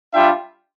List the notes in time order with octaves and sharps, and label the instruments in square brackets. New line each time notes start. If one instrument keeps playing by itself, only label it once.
[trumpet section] G3 D4 F4 E5 G5